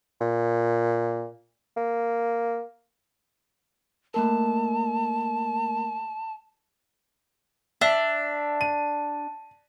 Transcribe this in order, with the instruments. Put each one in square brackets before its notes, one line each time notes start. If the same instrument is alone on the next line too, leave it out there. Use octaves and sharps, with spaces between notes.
[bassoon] A#2
A#3
[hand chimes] A3 A#3 A#4 [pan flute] A5
[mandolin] D4 [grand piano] E5
[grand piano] D#7